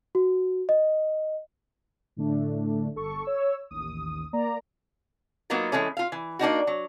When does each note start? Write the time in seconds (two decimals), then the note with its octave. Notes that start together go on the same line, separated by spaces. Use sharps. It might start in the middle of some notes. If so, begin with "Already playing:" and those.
0.15 F#4
0.69 D#5
2.16 A2 D3 A3 D4
2.95 G1 A4 C#6
3.25 C#5 E6
3.70 A1 D#2 D#6
4.33 A#3 D5 A#5
5.50 F#3 A#3 B3 D#4 F4 A#4
5.72 E3 G#3 A3 C#4
5.97 F4 F5
6.12 E3
6.39 A#3 D4 D#4 F#4
6.67 F#3